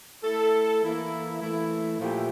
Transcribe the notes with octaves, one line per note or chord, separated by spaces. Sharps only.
A3 E4 A4
E3 A#3 E4 A4
E3 A3 E4
A#2 F3 A3 E4 G4